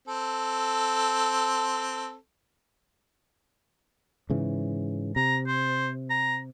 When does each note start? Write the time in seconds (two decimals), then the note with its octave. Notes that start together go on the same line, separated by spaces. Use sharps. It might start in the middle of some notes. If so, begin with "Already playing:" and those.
0.08 C4 A4
4.30 G#2 C#3 E3
5.16 C3 A#5
5.47 C5
6.10 A#5